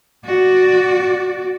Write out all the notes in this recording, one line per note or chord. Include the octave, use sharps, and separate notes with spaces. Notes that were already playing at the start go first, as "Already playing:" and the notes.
F#4 D5